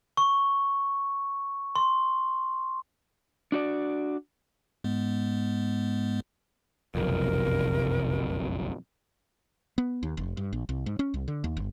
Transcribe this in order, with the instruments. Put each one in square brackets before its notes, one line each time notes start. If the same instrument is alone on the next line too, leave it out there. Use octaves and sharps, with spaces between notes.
[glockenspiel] C#6
C6
[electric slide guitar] D4 F#4 D5
[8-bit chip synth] G#2 G#3 B3
[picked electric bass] F#1 B1 F2 [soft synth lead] C3 [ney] A#4
[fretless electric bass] B3
D#2
F1
G2
A#1
C2
G#2
C#4
C2
D3
D#2
G1